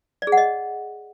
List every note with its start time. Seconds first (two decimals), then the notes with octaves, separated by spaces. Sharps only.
0.22 D5
0.27 G#4
0.32 F#5
0.37 D#5